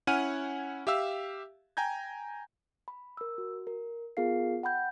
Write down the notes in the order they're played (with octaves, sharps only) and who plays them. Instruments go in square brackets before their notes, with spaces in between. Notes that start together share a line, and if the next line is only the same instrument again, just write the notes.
[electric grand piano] C#4 E4 F#5 G#5 F6 D#7
G4 E5 F5 E6
G5 G#5 A#5 G6 G#6
[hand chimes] B5
A#4 E6
F#4
A#4
B3 F4 G#4 A#4 F5 C7
F#5 G5 B5 G6